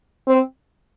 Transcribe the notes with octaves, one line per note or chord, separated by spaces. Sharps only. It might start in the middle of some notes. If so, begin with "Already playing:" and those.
C4